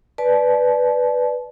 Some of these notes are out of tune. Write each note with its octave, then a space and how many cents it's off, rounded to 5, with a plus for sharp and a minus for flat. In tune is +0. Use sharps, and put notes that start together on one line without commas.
B4 +0 D5 +0 A5 -30